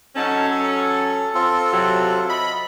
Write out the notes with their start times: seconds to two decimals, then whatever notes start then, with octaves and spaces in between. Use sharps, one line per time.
0.16 F#3 C#4 D#4 A4 A5
0.50 A4
1.35 C4 F4 A4
1.73 C3 F#3
2.29 D#5 E5 B5